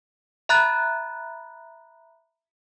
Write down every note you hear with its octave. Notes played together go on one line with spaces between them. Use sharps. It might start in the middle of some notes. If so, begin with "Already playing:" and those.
E5 A#5 B5 F#6 A6